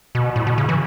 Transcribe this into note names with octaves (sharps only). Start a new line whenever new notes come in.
B2
A2
B2
C#3
E3